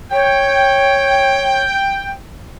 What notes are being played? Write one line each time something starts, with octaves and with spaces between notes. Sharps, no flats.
C#5 G5